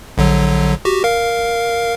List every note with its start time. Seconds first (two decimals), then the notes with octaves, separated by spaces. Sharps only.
0.18 A#1 D3 F#3
0.85 F#4 G4
1.04 A#4 F5